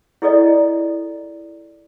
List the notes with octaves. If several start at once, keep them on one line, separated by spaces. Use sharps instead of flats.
E4 G#4 A4 D5 D#5